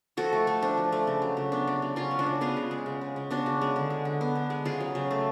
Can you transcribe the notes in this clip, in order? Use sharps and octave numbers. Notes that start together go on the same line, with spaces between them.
F3 F#4 A4
A3
A3
F3 D4
F3
A3
C#3
F#3
C#3
B3 D4
C#3
F#3
C#3 C#4 F4
G#3
D4 F#4
C#3
B3 F4 G#4
C#3
G#3
C#3
G#3
C#3
B3 D4 F#4
C#3
G#3
D3
G#3
D3
B3
D3
G#3
C#3 F4 G#4
F#3
C#3
A3